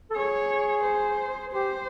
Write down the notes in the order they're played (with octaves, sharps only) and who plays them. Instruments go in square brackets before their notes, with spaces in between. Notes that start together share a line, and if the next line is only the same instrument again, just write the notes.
[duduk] A4
[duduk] G#4 [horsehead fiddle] C#5
[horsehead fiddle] C5
[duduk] G4 [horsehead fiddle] C5